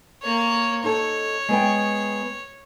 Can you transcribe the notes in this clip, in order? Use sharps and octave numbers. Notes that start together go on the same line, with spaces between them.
A#3 C#5
D#4 A4 C#5
G#3 B3 G5